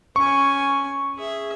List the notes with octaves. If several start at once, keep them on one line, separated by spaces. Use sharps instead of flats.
C#4 G#5 C#6
G#4 E5